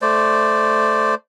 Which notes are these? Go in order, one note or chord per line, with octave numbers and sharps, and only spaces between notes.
A3 C5 D5